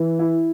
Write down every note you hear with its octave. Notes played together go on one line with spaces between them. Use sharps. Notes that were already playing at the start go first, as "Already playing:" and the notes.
Already playing: E3
E4